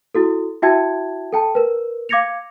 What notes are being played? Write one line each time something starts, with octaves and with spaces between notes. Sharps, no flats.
E4 F#4 A4
E4 F#4 E5 G5 A5 G#6
A4 G5 A5
A#4 B4
F5 D6 G#6 A#6 C#7 F7